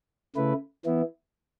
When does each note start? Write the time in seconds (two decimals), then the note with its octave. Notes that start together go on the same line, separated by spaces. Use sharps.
0.36 C#3 A3 E4 B4
0.85 E3 B3 E4